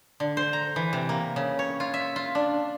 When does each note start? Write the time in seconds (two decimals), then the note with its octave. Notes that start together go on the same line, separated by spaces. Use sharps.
0.20 D3
0.37 C5
0.53 A#5
0.76 E3
0.93 C3
1.09 A#3
1.36 C#3
1.59 C#5
1.80 F4
1.94 E5
2.16 F4
2.35 D4